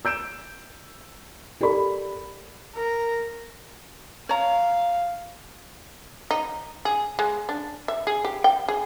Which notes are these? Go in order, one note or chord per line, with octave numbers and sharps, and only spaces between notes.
E6 G6 D7 E7
G4 A4 A#4 D5 B5
A#4
C#5 F5 A#5
D#4
G#4
G#3
D4
E5
G#4
G4
G5
G#4